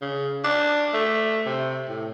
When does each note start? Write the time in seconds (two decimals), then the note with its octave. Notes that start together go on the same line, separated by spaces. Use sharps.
0.02 C#3
0.44 D4
0.94 A3
1.46 C3
1.89 A2